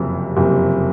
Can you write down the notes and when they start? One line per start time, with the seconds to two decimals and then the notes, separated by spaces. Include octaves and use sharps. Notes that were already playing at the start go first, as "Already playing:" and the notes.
Already playing: F#1 F2 C3
0.37 F#1 F2 C3